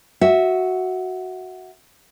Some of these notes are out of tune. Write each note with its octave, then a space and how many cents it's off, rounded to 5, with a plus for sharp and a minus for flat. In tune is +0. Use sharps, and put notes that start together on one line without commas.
F#4 +0 E5 -10